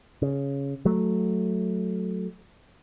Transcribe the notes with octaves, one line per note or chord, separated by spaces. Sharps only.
C#3
F#3 A3